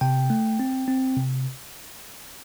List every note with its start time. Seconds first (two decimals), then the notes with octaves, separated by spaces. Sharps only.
0.01 C3 G5
0.30 A3
0.59 C4
0.88 C4
1.17 C3